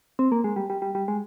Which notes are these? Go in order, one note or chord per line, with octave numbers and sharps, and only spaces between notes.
C4
A#3
G#3
G3
G3
G3
G3
G#3